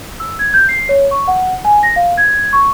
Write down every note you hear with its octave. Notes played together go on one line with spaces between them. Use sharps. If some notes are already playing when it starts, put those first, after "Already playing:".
E6
G#6
G6
C7
C#5
C#6
F#5
G#5
A#6
F5
G#6
C#6